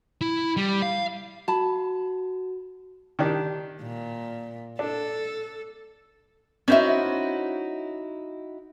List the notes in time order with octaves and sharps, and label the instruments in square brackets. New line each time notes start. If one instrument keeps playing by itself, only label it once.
[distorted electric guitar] E4
G3
F5
[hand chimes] F#4 [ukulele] A5 B5
[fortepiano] D#3 D4 G4
[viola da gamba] A#2
[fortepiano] D4 [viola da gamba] A4
[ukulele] C#4 C5 E5 [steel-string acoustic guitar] D#4 E4 F#4